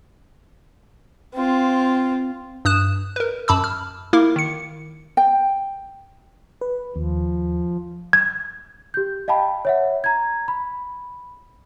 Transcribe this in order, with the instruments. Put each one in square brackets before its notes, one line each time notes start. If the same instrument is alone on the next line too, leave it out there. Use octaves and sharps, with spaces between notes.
[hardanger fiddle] C4 F4
[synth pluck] G2 D#6 F#6 E7
A#4 B4
F#2 A5 B5 D6 E6
F6
A#3 E4 A#4 D6
D#3 C#7
[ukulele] G5
[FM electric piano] B4
[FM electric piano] D#2 [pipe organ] F3
[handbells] G#6
[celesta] G4 G6
D#5 F5 G5 A5 B5
C#5 E5 F#5
A#5 G#6
B5